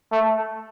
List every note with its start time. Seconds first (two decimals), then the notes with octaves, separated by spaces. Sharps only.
0.12 A3